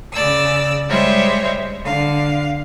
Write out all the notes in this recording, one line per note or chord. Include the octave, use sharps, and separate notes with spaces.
C#3 D5 E6
G3 G#3 C5 C#5 E5
D3 F5